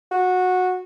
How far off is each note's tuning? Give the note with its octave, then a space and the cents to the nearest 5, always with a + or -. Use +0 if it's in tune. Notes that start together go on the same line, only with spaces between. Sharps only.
F#4 -15